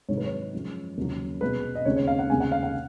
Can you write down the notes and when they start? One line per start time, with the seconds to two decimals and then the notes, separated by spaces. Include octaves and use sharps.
0.09 G#2 D#3 F#3 C#5
0.17 B4
0.26 C#5
0.53 F#2 F3 G#3
0.97 D#2 C#3 F#3
1.41 C#2 B2 G#3 B4
1.75 D#5
1.85 D#2 C#3 G#3 C#5
1.96 C#5
2.07 F5
2.19 F#5
2.29 D#2 C#3 G#3 G#5
2.40 F#5
2.52 F5
2.63 F#5